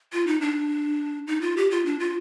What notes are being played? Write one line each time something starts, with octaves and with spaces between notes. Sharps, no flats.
F4
D#4
D4
D#4
F4
G4
F4
D4
F4